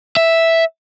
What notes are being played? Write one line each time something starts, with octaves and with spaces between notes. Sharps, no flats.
E5